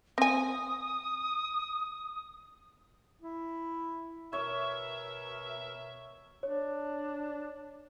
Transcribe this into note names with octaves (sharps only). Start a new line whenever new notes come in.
C4 G#5 D#6
E4
B2 A#4 C#5 E5
D4 C#5